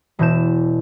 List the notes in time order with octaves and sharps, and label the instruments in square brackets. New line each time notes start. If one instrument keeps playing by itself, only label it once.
[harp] E1 B2 E3 A5 G6 E7